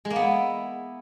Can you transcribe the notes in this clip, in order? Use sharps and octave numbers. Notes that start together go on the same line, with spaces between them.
G#3
A#3
B3
E4